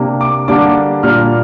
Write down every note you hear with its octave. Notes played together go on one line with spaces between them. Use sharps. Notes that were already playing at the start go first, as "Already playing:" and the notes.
Already playing: C3 A#3 D4
D6
D3 G3 A#3 D4 D6
A#2 G3 A#3 D4 F6